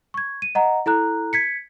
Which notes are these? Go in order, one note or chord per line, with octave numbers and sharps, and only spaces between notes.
C#6 G#6
D#7
D#5 F#5 A#5
E4 A4 A#5 F#6
G#6 B6 C#7